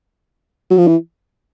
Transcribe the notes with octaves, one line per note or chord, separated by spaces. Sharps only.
F#3
F3
E3